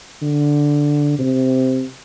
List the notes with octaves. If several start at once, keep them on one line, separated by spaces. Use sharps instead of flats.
D3
C3